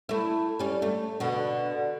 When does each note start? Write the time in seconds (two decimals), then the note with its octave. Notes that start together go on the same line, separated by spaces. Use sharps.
0.09 A3 E4
0.59 G3 C#4
0.82 A3
1.20 B2 D3